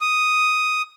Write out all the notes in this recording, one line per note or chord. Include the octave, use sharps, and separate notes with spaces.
D#6